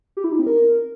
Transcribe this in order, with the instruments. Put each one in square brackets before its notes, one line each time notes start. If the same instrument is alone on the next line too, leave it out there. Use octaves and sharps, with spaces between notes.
[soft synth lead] G4
E4
D#4
C4
A#4